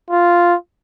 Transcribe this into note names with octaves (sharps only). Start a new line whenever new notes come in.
F4